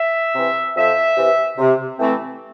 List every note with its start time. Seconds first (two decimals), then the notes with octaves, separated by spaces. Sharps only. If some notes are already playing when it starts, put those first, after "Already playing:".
Already playing: E5
0.34 C3 E3
0.76 F2 E5
1.16 C3 E3
1.58 C3
1.99 E3 A3 C4